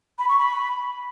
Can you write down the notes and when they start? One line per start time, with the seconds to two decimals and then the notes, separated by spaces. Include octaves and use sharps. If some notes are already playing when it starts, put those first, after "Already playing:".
0.19 B5
0.29 C#6
0.39 B5